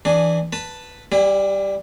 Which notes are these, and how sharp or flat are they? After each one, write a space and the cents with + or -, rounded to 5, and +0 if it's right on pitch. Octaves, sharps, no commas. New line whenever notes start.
E3 +0 D4 +0 G#4 +0
B4 +0 A5 +5
G3 +0 E4 +0 G#4 -45